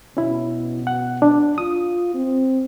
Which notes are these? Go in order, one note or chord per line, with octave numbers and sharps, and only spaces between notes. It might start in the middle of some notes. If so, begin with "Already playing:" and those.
B2 C#4 E4
F#5
D4
F4 D#6
C4